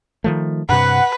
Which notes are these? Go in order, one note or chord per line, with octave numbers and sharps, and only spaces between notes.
D#3 F3 A3
G2 C3 B4 F#5